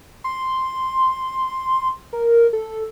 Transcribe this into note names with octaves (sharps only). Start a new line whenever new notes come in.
C6
A#4
A4